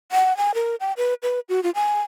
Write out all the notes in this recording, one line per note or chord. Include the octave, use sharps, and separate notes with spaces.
F#5
G#5
A#4
G5
B4
B4
F#4
F4
G#5